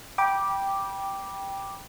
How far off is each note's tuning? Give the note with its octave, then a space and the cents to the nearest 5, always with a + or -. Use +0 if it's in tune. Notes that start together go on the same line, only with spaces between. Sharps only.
G5 +0 B5 -25 D6 +0